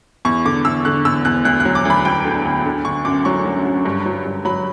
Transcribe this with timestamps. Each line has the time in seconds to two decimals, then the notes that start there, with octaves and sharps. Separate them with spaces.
0.25 E2 C#6
0.45 D3 D6
0.65 E2 E6
0.85 D3 F#6
1.05 E2 E6
1.25 E2 F#6
1.45 D2 F#6
1.60 F#6
1.65 F#3
1.75 D6
1.85 D2 B5
2.05 D2 G5
2.25 D3
2.45 D2
2.65 D3
2.85 D3 C#6
3.05 F#2 D6
3.25 F#3 C#6
3.45 F#3
3.65 F#3
3.85 G2
4.06 F#3
4.25 G2
4.45 F#3 B5